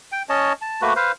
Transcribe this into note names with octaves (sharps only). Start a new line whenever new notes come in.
G5
C#4 C#5 D#5 A5
A5
A3 A#3 F#4 B4
B4 C5 F5